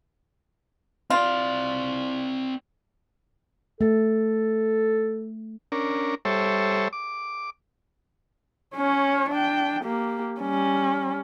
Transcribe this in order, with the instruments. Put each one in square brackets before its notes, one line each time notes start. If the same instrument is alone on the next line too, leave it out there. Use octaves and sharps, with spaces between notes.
[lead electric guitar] C4 D5 [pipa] F4
[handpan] A3 [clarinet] A4
[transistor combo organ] C#4 D4 A#4
G3 A4 C5 C#5 E5
D6
[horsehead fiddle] C#4 C#5
D4 G5
A#3 G4
G3 C#4